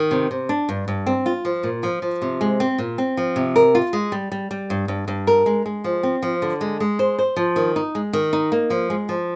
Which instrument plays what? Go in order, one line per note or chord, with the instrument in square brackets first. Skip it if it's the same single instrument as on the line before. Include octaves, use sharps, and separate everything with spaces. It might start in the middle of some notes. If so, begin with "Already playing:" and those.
Already playing: [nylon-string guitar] D#3
C3
C3
D4
G2
G2
C4
F4
F3
A#2
F3
F3
C3
G#3
C4
A#2
C4
F3
C3
A#4
F4
G#3
G3
G3
G3
G2
G2
G2
A#4
G#3
G#3
F3
C4
F3
D3
G#3
G#3
C5
C5
F3
D#3
D#4
G#3
D#3
D#4
A#3
F3
G#3
F3